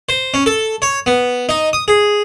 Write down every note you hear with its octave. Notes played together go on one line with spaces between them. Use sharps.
C5
C#4
A4
C#5
B3
D#4
D#6
G#4